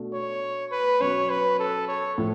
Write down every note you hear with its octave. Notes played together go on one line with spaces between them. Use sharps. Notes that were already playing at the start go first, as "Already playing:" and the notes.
Already playing: B2 A3 D4
C#5
B4
B2 F#3 C#4 C#5
B4
A4
C#5
A2 F3 A3